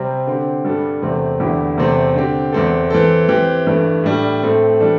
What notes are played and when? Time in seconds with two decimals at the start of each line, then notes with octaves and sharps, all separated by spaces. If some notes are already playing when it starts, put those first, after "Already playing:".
Already playing: C3 G3 C4
0.27 D3 C4 G4
0.64 G2 G3 D4 A4
1.03 E2 C3 A3 C4
1.40 E2 D3 A3 E4 G4
1.78 E2 C3 A3 C4 A4
2.15 D3 C4 G4
2.53 E2 E3 C4 A4
2.90 E3 C4 A4
3.29 E3 C4 G4
3.67 G2 E3 A3
4.04 A2 G3 D4
4.42 A2 A3 C4 A4
4.80 E3 G3 D4 A4